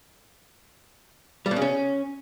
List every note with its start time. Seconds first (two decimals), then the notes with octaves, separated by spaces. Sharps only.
1.46 G3
1.51 B2
1.56 C#3
1.62 C#4